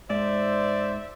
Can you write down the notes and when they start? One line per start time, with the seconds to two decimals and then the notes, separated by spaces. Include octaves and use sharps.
0.10 G#2 C5 D5 E5